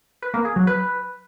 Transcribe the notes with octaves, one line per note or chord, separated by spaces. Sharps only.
B4
A#3
G#4
F#3
B4